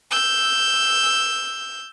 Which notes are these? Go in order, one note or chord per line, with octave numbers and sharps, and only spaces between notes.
E6 G6